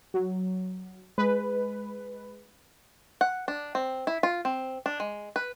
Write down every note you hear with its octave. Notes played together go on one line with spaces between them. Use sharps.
F#3
G#3 B4
F#5
D4
C4
E4
F4
C4
D4
G#3
B4